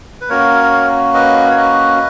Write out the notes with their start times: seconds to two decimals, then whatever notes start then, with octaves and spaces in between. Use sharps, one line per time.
0.21 B4
0.29 A#3 C#4 F#4 A#4 C#5
1.14 B4 D#5
1.50 C#5
1.57 B4 D#5